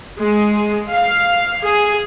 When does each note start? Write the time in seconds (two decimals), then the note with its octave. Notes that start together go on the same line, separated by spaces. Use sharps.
0.22 G#3
0.91 F5
1.64 G#4